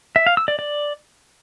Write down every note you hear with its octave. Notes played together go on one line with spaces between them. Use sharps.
E5
F5
E6
D5
D5